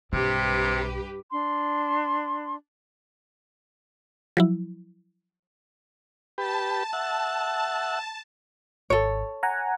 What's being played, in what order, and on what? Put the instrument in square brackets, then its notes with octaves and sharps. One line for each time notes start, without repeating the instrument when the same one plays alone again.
[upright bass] B1 D4 [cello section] G2 G4 B4 [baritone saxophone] C3
[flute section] D4 C6
[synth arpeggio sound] F3 F#3 E4
[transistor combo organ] G4 B4 [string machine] A5
[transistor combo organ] E5 F#5
[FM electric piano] G#1 [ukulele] A4 C#5
[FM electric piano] F#5 G#5 A#5